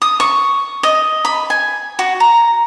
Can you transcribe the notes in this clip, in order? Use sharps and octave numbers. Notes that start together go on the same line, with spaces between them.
D#6
C#6
D#5
B5
G#5
F#4
A#5